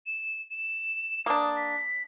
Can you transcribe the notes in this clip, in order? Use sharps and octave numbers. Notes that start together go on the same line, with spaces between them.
E7
E7
A#3 D4 D#6
B6